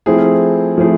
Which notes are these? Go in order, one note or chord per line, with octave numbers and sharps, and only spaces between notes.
F3 A3 C4 E4 G#4
F3 A3 C4 E4 G#4